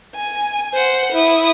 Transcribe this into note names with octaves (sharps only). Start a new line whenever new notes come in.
G#5
C5 F#5
E4 D#6